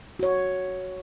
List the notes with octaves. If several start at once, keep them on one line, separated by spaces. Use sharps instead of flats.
F#4 C#5